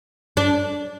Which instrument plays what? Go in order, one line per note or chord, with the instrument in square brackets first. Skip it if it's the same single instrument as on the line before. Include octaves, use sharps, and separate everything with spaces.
[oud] D4